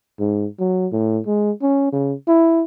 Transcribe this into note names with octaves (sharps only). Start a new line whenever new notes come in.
G#2
F#3
A2
G#3
C#4
C#3
E4